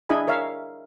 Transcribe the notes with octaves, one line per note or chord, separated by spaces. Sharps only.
D4 E4 G#4 D#5 G#5 B5
A#4 C#5 E5 F5